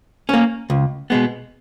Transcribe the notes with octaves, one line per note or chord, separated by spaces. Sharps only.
A#3 C#4
C#2
B2 G#3 B3